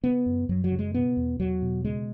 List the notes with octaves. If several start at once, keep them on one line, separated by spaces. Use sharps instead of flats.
C#3 B3
F#2
F#2 F#3
F#3
C#3
G#3
B2 B3
E2
E2 F#3
B2
C#3 G#3